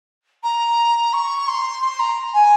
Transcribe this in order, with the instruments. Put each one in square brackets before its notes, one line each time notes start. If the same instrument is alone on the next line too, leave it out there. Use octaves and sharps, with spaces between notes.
[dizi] A#5
C#6
C6
C6
A#5
G#5